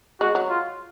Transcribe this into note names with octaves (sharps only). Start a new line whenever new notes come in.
G#3 F#4
F#3
F4